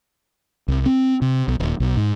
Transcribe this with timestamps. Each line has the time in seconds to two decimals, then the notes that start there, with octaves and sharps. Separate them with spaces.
0.68 C2
0.86 C4
1.22 C3
1.48 B1
1.60 D#1
1.80 B1
1.97 G#2